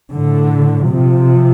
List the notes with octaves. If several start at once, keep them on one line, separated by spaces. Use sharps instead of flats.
A2 D3
C3 F3